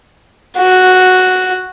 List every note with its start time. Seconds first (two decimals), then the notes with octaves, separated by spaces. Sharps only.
0.58 F#4